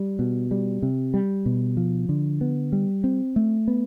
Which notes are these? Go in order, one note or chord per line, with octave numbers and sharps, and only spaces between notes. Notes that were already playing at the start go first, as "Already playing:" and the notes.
Already playing: G3
B2
G3
C3
G3
B2
F3
D3
B3
G3
C4
A3
B3